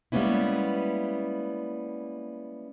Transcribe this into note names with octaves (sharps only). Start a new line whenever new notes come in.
G3 G#3 A#3 B3 C#4 E4